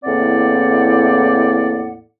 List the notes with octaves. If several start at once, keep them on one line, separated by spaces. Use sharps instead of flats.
E2 A2 A#3 C4 D5 F#5